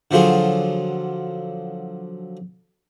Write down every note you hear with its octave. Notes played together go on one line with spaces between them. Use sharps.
D3 F3 F#3 F4 G#4